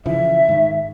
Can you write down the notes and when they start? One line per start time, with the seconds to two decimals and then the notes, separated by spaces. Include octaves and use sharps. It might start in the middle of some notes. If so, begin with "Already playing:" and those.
0.06 C#3 E3 F3 E5
0.49 G#2 D#3